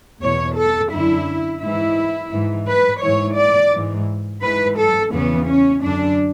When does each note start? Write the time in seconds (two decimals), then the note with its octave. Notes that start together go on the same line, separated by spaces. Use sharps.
0.22 E2 B2 C#5
0.57 A4
0.92 F#2 D3 E4
1.61 G#2 E3 E4
2.32 G#2 E3
2.67 B4
3.02 G#2 E3 C#5
3.37 D5
3.72 G#2 E3
4.42 G#2 E3 B4
4.77 A4
5.12 E2 C#3 E3 B3
5.47 C#4
5.82 F#2 D3 D4